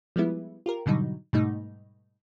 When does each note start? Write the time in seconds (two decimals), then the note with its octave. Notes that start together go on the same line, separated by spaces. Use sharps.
0.16 F3 G3 G#3 B3 E4
0.66 F4 G4 A#4
0.86 G#2 B2 D3 F#3 G3 D#4
1.33 G#2 B2 G3 A3 D#4